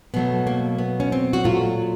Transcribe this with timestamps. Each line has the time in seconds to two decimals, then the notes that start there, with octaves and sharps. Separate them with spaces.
0.14 B2 F#3 A3 B3
0.47 A#3
0.79 B3
1.00 C#4
1.12 C4
1.33 F#4
1.44 A#2 F#3 A3 F4